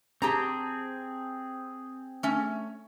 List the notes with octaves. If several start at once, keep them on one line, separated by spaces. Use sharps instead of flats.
C4 G4 G#4 A5 A#5
A3 C#4